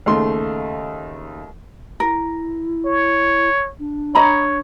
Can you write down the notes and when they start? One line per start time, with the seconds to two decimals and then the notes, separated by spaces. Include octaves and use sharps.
0.06 D#2 C#3 A3 C6
2.00 E4 A#4
2.86 C#5
3.79 D4
4.15 C#5 D#5 A#5 B5